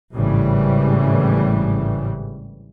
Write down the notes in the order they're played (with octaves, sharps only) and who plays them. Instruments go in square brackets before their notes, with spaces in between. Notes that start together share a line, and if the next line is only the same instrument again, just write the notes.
[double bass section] G#1 A2 C#3 E3 G3